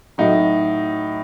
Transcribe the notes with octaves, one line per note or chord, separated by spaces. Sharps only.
A2 F#3 D#4